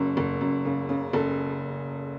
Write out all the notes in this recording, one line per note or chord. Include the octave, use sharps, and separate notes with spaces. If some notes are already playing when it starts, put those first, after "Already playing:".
Already playing: F#1 F#2
F#1
F#2
C#3
C#3
F#1 A4